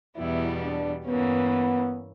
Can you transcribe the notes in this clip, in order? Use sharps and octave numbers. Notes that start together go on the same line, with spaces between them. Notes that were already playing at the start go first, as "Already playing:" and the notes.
E2 B2 G3 B3 E4
D4
G2 E3 A#3 B3 C#4